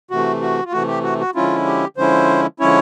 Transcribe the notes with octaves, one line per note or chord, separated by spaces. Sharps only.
C3 E3 A3 F#4
F#4
F4
C3 E3 A3 F#4
G4
F#4
F#4
D3 F3 G#3 C#4 E4 F4
G4
D3 F3 G#3 C#4 E4 C5
D3 F3 G#3 C#4 E4 C#5